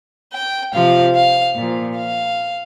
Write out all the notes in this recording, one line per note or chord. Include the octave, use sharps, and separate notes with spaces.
G5
C3 F3 F5
F5
A#2 F3
F5